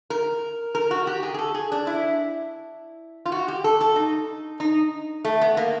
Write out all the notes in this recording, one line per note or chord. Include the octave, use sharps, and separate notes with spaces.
A#4
A#4
F#4
G4
G#4
G#4
A4
G#4
D4
E4
F4
F#4
G4
A4
A4
D#4
D#4
A3
B3
A#3